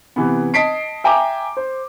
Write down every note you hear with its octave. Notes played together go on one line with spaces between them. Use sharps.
C3 E3 B3
D#5 A5 B6 C7 D7
E5 G5 G#5 A#5 D6
C5